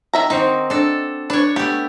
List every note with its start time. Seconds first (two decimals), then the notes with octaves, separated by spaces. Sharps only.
0.13 D#3 E5 A#5
0.30 D#3 C4 D#4 F#4
0.70 D4 A4
1.30 D4 B4 C#5
1.56 A3 B3 G4